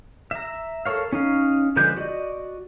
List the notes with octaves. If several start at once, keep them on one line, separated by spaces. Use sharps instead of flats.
E5 A#5
A4 A#4 C#5 F5
C#4 D#4 F5
D3 F3 G#3 B4 G6
F#4 D5 D#5